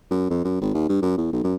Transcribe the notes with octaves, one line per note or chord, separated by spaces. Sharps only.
F#2
F2
F#2
G#1
D#2
G2
F#2
E2
B1
F#2